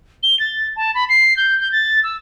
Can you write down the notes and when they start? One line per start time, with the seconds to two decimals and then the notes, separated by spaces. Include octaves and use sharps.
0.23 G7
0.40 A6
0.76 A5
0.95 B5
1.09 C7
1.37 G6
1.60 G6
1.72 A6
2.04 E6